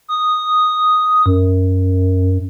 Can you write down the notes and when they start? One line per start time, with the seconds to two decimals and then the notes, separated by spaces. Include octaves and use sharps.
0.08 D#6
1.26 F#2